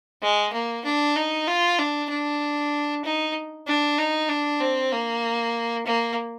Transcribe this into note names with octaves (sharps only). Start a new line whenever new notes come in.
G#3
A#3
D4
D#4
F4
D4
D4
D#4
D4
D#4
D4
C4
A#3
A#3